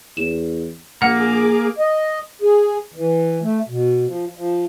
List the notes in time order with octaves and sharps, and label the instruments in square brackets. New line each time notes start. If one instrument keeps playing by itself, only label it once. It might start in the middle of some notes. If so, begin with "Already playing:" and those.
[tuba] E2 [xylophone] E7
[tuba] A#1 [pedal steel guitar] A#3 [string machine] G#4 D6 [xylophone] F#5
[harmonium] D#5
G#4
E3
A3
B2
F3
F3